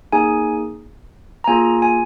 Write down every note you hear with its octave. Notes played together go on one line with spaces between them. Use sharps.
A#3 D#4 G#4 G#5
A#5
A#3 F4 G#4 G#5
G#5